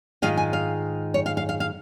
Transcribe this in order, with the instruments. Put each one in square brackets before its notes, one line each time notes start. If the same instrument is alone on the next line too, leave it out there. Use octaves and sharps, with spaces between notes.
[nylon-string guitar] G#2 D#3 G#3 F4 F5
G#5
F5
C#5
F5
F5
F5
F5